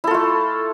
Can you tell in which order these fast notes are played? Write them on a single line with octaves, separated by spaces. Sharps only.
E4 A4 F4 A3